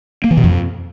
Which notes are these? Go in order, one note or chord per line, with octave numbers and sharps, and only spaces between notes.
A#3
E3
B2
F2